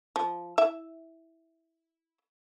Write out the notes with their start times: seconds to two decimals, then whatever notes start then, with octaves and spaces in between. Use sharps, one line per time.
0.16 F3
0.58 E4 E5